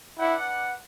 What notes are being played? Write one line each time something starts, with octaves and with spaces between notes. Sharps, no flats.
D4 E4 B4 D5 F#5